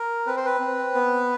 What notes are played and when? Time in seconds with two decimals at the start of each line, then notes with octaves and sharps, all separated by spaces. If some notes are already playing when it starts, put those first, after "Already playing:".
Already playing: A#4
0.27 C4 B4
0.37 C5
0.45 B4
0.60 C4
0.95 B3